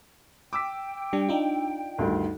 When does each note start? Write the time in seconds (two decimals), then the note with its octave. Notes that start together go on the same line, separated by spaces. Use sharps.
0.53 G5 D6 E6 B6
1.13 G3 D4
1.29 D4 D#4 F4
1.98 D2 G2 D#3